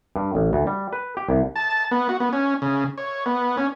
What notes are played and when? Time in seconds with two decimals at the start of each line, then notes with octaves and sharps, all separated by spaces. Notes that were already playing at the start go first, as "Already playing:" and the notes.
0.16 G2
0.35 A1
0.53 D2
0.67 G3
0.93 B4
1.17 G4
1.29 C2
1.56 A5
1.91 B3
2.09 F#4
2.20 B3
2.33 C#4
2.62 C#3
2.98 C#5
3.26 B3
3.57 C#4